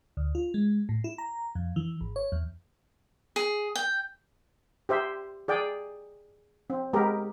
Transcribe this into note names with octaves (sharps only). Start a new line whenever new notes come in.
D2
F4
G#3
A2
E4
A#5
F2
E3
G#1
C#5
E2
G#4
G5
G4 C5 E5
G#4 D5 G5
C4
G#3 B3 G4 A#4